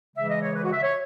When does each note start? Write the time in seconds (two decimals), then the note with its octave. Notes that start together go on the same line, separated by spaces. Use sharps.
0.15 C#3 E3 G#3 E5
0.29 D#5
0.42 C#5
0.54 B4
0.63 F#4
0.73 E5
0.82 C#5